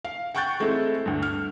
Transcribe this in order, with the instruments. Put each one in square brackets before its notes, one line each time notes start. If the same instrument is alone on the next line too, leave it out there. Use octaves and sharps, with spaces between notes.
[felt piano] F5
F#5 G5 C#6 F#6 G6 A6
G#3 A3 C4 E4 A4
D2 G2
F6